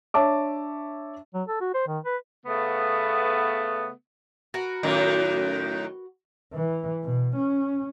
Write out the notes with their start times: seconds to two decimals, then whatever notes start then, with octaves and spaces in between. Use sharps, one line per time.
0.14 D4 C#5 E5 A5 D6
1.34 F#3
1.48 A4
1.61 F#4
1.74 C5
1.87 D#3
2.05 B4
2.45 C#3 A3 B3
4.54 F#4 A#4 B4
4.83 F#2 A2 D#3
6.53 E3
7.04 B2
7.36 C#4